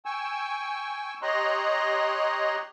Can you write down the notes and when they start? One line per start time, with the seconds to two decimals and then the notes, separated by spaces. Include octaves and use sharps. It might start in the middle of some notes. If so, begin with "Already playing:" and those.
0.05 G5 G#5 C#6 E6
1.22 G4 C#5 D#5 A#5 C6 F#6